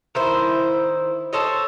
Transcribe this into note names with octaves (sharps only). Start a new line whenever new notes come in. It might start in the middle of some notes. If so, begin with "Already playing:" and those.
D#3 E4 C5
A4 C5 C#5 D#5